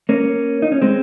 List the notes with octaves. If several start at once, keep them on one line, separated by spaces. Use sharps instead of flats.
A#3 C#4
D#4
C#4
G#3 C4